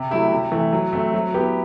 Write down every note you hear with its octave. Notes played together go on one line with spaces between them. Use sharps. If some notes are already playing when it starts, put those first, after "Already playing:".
Already playing: C3
F#3 A3 E4 G4
C3
E3 A3
F#3
A3 C4
F#3
B3 E4 G4